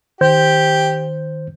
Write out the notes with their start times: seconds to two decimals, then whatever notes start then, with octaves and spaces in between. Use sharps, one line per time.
0.21 D#3 G4 C5 G6